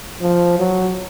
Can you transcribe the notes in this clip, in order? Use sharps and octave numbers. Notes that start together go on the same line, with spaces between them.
F3
F#3